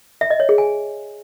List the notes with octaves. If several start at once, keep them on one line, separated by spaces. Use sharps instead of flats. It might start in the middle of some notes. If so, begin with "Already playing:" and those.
E5
D#5
C#5
G#4
G#5